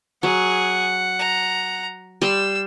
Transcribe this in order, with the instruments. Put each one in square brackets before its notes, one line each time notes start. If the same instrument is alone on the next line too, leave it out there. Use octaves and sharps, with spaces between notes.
[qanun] F#3 [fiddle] G#4 [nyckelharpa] F#5
[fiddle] A#5
[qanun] G3 C6 [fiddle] E6